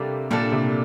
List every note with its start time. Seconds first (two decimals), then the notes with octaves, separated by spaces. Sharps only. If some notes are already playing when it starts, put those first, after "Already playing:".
Already playing: C3 G3 A#3 D4 A4
0.31 A#2 G3 A#3 D4 A4
0.52 C3